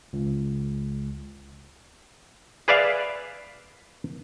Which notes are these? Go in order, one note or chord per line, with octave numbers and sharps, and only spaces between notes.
C#2
G#4 B4 D5 E5 F5